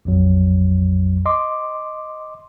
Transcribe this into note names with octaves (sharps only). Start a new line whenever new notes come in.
A#1 F2 F#3
D#5 C6 D6